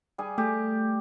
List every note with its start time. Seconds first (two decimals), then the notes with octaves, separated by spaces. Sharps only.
0.18 G3 G#4 G#5
0.38 A3 G4